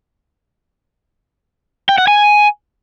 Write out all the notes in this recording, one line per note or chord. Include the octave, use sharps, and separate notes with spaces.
G5
F#5
G#5